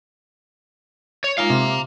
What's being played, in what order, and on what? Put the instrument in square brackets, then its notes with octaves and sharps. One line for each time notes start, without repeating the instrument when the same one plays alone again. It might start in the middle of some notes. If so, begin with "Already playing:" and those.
[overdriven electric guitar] C#5
[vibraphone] G#3 D#4 F4 [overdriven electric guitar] F5 A#5
[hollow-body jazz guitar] C3 [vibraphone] E5